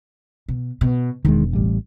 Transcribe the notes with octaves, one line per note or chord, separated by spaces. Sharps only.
B2
B2
E1 D#3 G#3
A1 G3